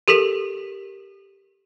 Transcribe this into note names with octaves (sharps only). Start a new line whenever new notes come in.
G4 A4 A#4 B6 E7